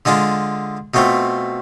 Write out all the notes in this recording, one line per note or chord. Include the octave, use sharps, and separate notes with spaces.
D3 G#3 D4 F4
B2 A3 C4 F4